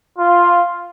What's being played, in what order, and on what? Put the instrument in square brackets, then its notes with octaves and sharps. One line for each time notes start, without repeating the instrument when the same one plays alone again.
[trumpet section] F4